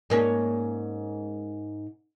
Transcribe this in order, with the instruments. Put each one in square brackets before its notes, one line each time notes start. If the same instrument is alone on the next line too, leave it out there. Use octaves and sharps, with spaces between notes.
[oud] G#2 A#3 C#4